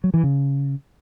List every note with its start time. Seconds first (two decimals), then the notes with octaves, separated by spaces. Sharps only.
0.04 F#3
0.14 E3
0.24 C#3